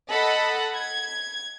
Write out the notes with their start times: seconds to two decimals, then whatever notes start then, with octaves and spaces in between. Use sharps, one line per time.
0.11 A4 D#5 F#5 B5
0.75 G#6